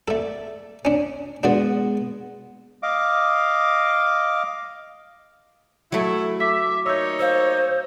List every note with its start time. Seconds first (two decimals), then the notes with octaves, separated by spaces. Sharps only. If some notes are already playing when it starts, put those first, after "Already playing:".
0.08 A3 A4 D5
0.85 C#4 D4
1.43 G#3 B3 D4 F#4 D5
2.83 D#5 F5 D6
5.92 F#3 A3 E4
6.40 E5 D6 B6
6.86 A#2 D#4 C#5 E6 G6
7.19 C5 F5 E6